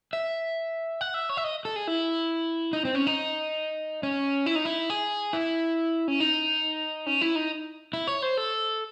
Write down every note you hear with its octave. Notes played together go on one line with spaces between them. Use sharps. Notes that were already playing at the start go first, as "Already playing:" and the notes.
E5
F#5
E5
C#5
E5
D#5
A4
G#4
E4
D#4
C4
C#4
D#4
C#4
E4
D#4
E4
G#4
E4
C#4
D#4
C#4
E4
D#4
E4
C#5
C5
A4